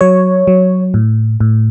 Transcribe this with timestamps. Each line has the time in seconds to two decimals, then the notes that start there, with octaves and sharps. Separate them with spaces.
0.01 F#3 C#5
0.47 F#3
0.94 A2
1.40 A2